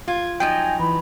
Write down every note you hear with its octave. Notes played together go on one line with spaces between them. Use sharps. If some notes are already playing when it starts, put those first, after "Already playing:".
F4 G#6
F3 F#3 D#4 G5 G#5
E3 B5